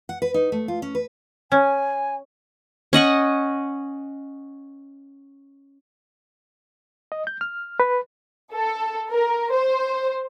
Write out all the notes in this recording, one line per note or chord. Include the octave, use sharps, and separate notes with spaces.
F#5
B4
D#4
A3
F4
C#4
B4
C#4 G#5
C#4 D#5 F#5 C#6
D#5
G6
F6
B4
A4
A#4
C5